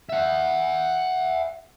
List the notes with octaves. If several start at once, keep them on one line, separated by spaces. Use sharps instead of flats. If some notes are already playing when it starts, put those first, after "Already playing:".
E5 F#5